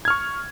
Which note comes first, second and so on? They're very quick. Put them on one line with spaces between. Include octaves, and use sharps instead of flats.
G#6 F6 C#6